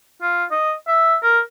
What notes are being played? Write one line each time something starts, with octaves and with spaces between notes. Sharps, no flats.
F4
D#5
E5
A#4